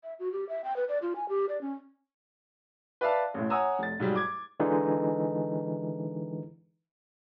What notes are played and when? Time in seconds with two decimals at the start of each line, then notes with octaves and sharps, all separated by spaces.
0.03 E5
0.19 F#4
0.32 G4
0.49 E5
0.64 G5
0.76 B4
0.89 D5
1.02 F4
1.16 G#5
1.29 G4
1.49 D5
1.61 C#4
3.01 B4 D5 E5 F5 A5
3.34 A1 A2
3.50 C#5 F#5 G#5 A#5 D#6 E6
3.79 F1 A6
4.00 G#2 F#3 G3
4.15 D6 G#6
4.60 D3 E3 G#3 D#4